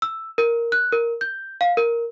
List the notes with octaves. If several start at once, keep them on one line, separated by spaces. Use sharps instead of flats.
E6
A#4
F#6
A#4
G6
F5
A#4